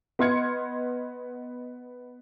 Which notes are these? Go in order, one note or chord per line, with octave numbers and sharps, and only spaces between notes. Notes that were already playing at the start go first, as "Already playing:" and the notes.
B3 D#5 C6 F6 G#6 C#7